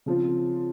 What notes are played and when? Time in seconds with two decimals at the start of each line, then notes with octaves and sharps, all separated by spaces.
0.06 C#3 F3 C4 F4